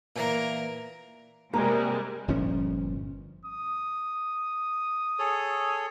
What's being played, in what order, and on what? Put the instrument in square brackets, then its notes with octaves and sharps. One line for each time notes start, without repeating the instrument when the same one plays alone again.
[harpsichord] A#2 E3 A#3 [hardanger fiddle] A#4 A#5
[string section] C3 G3 G#3 [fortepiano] A#3 [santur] A#4
[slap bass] G1 A#2 F3 C#4
[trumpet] D#6
[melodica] G#4 A4 C#5